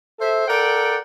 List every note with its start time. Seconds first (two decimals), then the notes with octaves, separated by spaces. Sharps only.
0.19 A4 C5 E5
0.48 A4 A#4 D5 F#5 G5